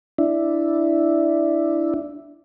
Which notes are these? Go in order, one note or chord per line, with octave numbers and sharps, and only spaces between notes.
D4 E4